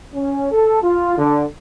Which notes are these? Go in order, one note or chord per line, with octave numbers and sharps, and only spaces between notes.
C#4
A4
F4
D3